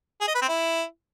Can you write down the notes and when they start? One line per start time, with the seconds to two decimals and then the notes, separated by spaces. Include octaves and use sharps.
0.21 G#4
0.28 D#5
0.35 B4
0.42 C4
0.49 E4